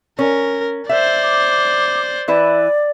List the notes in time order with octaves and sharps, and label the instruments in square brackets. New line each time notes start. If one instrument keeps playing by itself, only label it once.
[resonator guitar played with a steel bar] C#4 [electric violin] A#4
[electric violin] C5 D5 [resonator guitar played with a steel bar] E5
[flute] D6
[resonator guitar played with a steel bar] E3 E4 B4 [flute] D5